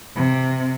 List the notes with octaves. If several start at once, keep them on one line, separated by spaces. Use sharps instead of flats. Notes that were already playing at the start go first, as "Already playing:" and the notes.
C3